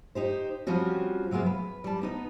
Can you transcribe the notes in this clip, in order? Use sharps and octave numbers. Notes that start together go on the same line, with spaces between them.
D#4 G4 C5
F3 G3 C4 C#4 F#4
C3 F#3 G#3 A#3 B3
B4
G3 A5
B3 D#4 B4